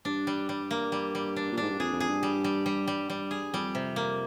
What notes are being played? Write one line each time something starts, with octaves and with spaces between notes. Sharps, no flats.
G2 D4
G3
G3
A#3
G3
G3
D4
A#2
G#2 D4
G2
F2 G#4
F2
G#4
G2
G3
G3
G3
G3
G2 G3
G#4
F2 G3
C3
A#3